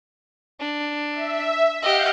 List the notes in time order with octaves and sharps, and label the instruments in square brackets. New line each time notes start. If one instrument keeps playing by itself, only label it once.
[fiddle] D4
[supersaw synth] E5
[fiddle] G4 D#5 [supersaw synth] F5 F#5 G6